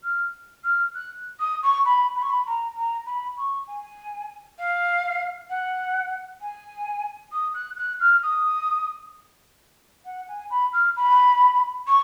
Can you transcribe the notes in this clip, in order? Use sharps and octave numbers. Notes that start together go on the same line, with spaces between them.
F6
F6
F#6
D#6
C#6
B5
B5
C#6
B5
A#5
A#5
B5
C#6
G#5
F5
F#5
G#5
D#6
F#6
F#6
F6
D#6
F#5
G#5
B5
F6
B5
C#6